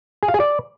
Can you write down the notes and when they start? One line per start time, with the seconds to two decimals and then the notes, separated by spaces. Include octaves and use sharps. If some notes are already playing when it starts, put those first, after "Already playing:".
0.23 G#4
0.28 F5
0.34 G#4
0.40 D5